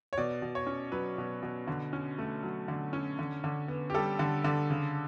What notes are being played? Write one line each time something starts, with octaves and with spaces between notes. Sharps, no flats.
C#5
B2 D5
B2
C#5
C#4
F#3 B4
B2
B2
D3
C#4
A3
F#3
D3
C#4
D3
D3
B3
G4
G3 A4
D3
D3
C#3